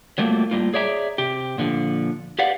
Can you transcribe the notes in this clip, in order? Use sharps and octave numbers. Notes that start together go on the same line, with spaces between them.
F#3 G3 A3 A#3 F4
A2 G3 A#3 F4
G#4 C#5 D5 E5 A5 A#5
C3 G4
A#2 D3 F3
G4 B4 D5 F5 F#5